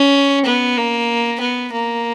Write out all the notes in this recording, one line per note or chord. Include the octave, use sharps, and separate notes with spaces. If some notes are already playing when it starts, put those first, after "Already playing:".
Already playing: C#4
B3
A#3
B3
A#3